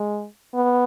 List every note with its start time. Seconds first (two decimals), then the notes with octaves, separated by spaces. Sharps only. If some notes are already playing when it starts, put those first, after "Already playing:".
Already playing: G#3
0.54 B3